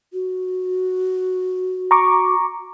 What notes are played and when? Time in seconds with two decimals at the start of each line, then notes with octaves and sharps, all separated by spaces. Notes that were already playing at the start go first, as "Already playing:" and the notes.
0.13 F#4
1.91 A#5 C#6 D6